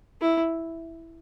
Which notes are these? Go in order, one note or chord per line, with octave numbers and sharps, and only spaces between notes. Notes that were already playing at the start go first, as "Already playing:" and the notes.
E4